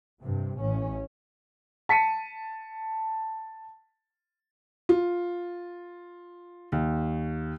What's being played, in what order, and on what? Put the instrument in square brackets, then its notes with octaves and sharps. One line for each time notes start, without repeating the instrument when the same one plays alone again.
[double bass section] G2 C3
A1 C#4
[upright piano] A5 B6 C#7 D#7
[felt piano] F4
D#2